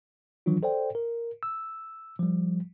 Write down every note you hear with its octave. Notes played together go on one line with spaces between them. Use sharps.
D#3 E3 F#3 D4 F4
A4 C5 D5 G5
A#4
E6
F3 G3